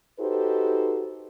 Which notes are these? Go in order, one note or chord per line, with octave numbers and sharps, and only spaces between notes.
D#4 F#4 G4 A4 B4 C5